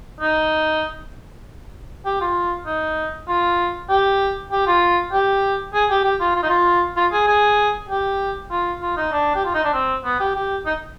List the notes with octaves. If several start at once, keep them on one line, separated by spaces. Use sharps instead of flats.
D#4
G4
F4
D#4
F4
G4
G4
F4
G4
G#4
G4
G4
F4
F4
D#4
F4
F4
G#4
G#4
G4
F4
F4
D#4
D4
G4
F4
D#4
D4
C4
B3
G4
G4
D#4